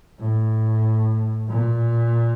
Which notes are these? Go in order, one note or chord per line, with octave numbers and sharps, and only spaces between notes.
A2
A#2